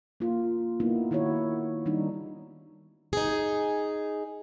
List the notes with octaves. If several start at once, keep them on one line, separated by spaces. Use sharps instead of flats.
A#3 F4
A#3 B3 D#4 E4
D#3 E4 F#4 C#5
D#3 G3 D4 D#4
D#4 G#4